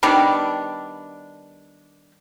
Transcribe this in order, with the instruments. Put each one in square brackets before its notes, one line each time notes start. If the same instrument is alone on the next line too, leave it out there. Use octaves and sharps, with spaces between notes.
[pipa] D#3 G3 B3 D4